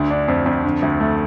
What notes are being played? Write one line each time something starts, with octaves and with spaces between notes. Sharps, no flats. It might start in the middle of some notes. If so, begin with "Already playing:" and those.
Already playing: D2 D3
D4
F2
F2
D3
D2
A3